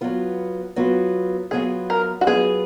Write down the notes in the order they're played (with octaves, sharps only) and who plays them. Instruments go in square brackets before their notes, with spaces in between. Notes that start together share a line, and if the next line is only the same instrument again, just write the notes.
[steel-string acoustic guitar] F#3 B3 F4 B4
F#3 B3 F4 B4
[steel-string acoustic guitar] F#3 B3 F4 B4 [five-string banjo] G#4
[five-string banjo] A#4
F#4
[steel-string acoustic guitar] F#3 B3 F4 B4 [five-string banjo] G#4